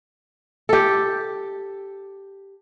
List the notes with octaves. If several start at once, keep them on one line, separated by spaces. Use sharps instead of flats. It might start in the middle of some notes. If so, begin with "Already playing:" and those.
G4 A4